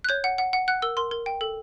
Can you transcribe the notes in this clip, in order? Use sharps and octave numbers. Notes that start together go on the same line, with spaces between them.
F#6
C#5 G6
F#5
F#5
F#5
F#5 F#6
A#4 E6
A#4 C6
A#4
G5
A4